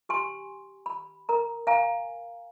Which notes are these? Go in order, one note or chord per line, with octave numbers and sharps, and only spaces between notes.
G4 G#5 C6
B5
A#4 A#5
F5 G#5 A#5